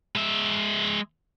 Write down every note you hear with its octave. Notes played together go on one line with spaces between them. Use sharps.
G#3 E5